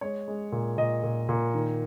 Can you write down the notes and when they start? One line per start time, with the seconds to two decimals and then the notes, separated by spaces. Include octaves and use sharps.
0.01 G#3 C#5
0.28 G#3
0.52 A#2
0.77 A#2 D#5
1.03 A#2
1.29 A#2
1.54 D#3